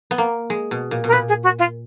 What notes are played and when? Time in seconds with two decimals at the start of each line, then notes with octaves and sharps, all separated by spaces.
0.11 B3
0.18 A#3
0.50 G#3
0.71 B2
0.91 A#2
1.04 B2 A#4
1.12 A#2 B4
1.28 G#4
1.43 F#4
1.59 F4